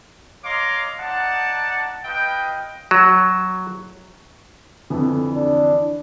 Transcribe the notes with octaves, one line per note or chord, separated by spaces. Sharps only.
C#5 D#5 F5 A#5 C6 D6
D#4 D5 F#5 A5
F4 B4 D#5 G5
F#3
F2 D3 E3
D4